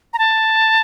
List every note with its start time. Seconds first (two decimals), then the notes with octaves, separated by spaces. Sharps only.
0.13 A#5
0.18 A5